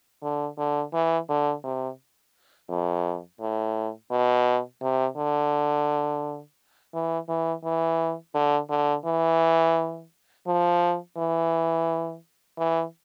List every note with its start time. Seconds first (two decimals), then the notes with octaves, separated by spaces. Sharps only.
0.23 D3
0.58 D3
0.93 E3
1.29 D3
1.64 C3
2.69 F2
3.40 A2
4.11 B2
4.82 C3
5.17 D3
6.94 E3
7.29 E3
7.64 E3
8.34 D3
8.70 D3
9.05 E3
10.47 F3
11.18 E3
12.58 E3